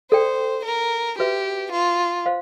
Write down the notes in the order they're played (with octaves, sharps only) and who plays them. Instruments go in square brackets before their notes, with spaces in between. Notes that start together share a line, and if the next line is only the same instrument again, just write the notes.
[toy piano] A4 D5 G5 [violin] C5
[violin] A#4
[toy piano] F#4 B4 E5 [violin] G4
[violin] F4
[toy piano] C5 F5